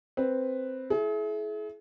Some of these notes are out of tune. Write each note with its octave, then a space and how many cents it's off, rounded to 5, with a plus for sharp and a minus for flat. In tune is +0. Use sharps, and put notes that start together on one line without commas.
C4 +0 B4 +0
E4 +0 G#4 +40